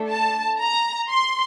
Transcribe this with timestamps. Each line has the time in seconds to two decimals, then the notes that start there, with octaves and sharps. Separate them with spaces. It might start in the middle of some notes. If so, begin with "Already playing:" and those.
Already playing: A3 D4 A4
0.09 A5
0.59 A#5
1.08 C6